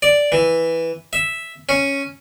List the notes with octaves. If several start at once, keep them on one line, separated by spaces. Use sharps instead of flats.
D5
E3
E5
C#4